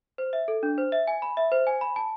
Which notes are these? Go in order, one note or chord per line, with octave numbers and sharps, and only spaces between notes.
C5
E5
A4
D4
C5
E5
G#5
B5
E5
C5
G#5
B5
A5